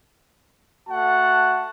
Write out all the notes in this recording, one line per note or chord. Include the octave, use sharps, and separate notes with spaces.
A3 F#4 F#5 A5